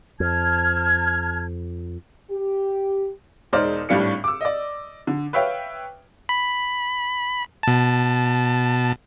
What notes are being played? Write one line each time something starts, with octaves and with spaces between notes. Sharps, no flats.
F2 A5 F6 G#6
G4
E1 G#3 D#4 C5 D5 F6
G#1 A2 G3 D4 F5 C#7
D6 E6
D5 D#5
D3
B4 C#5 E5 F5 G5
B5
B2 A5